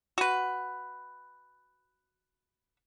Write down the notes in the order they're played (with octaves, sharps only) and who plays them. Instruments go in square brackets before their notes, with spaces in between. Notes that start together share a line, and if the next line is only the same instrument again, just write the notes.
[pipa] F#4 B4